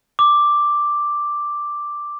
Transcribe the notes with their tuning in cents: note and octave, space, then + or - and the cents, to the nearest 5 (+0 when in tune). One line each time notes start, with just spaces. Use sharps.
D6 +0